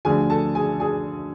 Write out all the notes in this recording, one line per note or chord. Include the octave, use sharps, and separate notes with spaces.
D2 D3 F3 G#4 G#5
A4 A5
G#4 G#5
G#4 G#5